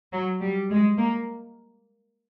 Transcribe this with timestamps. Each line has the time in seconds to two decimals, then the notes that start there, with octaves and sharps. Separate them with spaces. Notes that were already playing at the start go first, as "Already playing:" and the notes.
0.13 F#3
0.41 G3
0.70 G#3
0.98 A#3